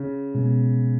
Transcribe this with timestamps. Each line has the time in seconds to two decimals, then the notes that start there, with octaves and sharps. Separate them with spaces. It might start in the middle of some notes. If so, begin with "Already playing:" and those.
Already playing: C#3
0.35 B2 G#3 B3